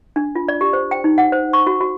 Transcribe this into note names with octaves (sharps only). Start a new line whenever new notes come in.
D4
F4
D5
G4
C5
G5
D#4
F#5
C5
C#6
F#4
F#4